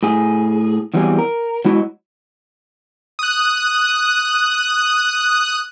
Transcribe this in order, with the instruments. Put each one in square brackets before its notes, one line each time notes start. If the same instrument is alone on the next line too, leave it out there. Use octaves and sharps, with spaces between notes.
[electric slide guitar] A2 G#4
E2 E3 F#3 G3 C4 G#4
A#4
F#3 G#3 E4 F#4 D#5
[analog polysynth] D#6 F#6